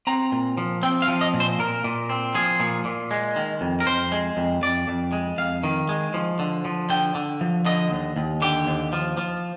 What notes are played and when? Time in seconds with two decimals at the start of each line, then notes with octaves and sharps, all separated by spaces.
0.07 C4 A#5
0.32 A#2
0.58 F3
0.83 C4 G5
1.02 F5
1.08 F3
1.21 D#5
1.34 A#2
1.40 C5
1.59 A#2 A#4
1.84 A#2
2.09 C4
2.35 F3 G#4
2.60 A#2
2.85 A#2
3.11 G#3
3.36 D#3
3.61 F2
3.80 A#4
3.86 F2 C5
4.12 G#3
4.37 F2
4.62 F2 D5
4.88 F2
5.12 G#3
5.38 F2 F5
5.63 D#3
5.89 G#3
6.14 F3
6.39 D3
6.65 F3
6.90 D3 G5
7.15 D3
7.41 F3
7.65 D3 D#5
7.91 D#2
8.16 D#2
8.42 D3 G4
8.67 D#2
8.93 F3
9.17 F3